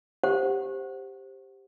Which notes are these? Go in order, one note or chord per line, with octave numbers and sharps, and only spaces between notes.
G4 C5 F#5